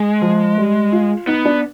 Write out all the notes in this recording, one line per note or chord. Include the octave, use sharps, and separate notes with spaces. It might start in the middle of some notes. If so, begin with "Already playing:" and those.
Already playing: G#3
F3
G3
F4
B3 D#4
D4